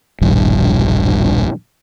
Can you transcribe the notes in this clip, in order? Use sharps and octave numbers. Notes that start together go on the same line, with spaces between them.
E1 A#1 G2 D#3